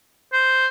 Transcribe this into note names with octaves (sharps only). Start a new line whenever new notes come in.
C5